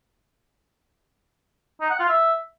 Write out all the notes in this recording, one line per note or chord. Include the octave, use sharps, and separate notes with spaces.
D#4
F#5
F4
E5